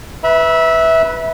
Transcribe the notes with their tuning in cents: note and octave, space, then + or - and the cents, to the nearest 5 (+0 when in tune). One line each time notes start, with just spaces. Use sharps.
B4 +0 E5 -15 B5 -40